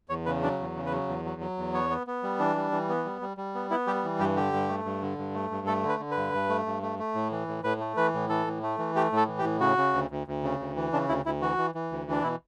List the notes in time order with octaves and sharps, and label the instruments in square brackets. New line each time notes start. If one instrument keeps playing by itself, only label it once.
[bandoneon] E2 C#5
C#3 B4
F#3 D4
E2
C#3
B4
F#3
E2
F#3
F#3
E2
B3 C#5
B3
B3
G3
E3 D4
G3
E3
B3
G3
G3
G3
B3
B3 E4
G3 G4
E3
G2 G4
D3 G4
G2
A3
G2
D3
G2
A3
G2
A3 A4
D3
B4
D3
B4
G2
G2
A3
G2
A3
A3
A2
E3
A2
A2 B4
A3
E3 B4
A2
E3 A4
A2
A3
E3
A3 G4
A2 A4
E3
G4
A2
C#3 F#4
C#3
D2
D2
D2
C#3
D2
E3
C#3 D4
D2 E4
D2 E4
E3 F#4
E3
E3
D2
E3 D4
B2 E4